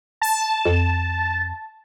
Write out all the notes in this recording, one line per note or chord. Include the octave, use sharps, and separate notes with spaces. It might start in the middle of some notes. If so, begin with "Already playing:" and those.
A5
F2